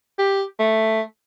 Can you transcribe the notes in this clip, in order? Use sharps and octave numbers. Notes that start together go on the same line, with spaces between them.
G4
A3